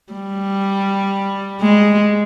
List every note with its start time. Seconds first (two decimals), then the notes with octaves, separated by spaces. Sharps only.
0.13 G3
1.61 G#3